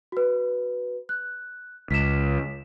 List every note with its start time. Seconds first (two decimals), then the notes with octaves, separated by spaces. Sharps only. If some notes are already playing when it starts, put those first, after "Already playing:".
0.12 F#4 B4
1.09 F#6
1.91 C#2 B6 E7